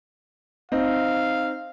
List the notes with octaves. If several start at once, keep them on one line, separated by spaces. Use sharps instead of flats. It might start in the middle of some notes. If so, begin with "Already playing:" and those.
C4 D#4 F5